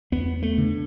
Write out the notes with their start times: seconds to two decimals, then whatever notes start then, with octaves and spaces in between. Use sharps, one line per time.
0.12 E2 B3
0.42 A3
0.58 D3